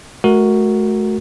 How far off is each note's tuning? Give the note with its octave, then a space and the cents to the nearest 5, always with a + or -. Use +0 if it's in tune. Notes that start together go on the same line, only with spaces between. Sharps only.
A3 -35 F#4 +0 A#4 +0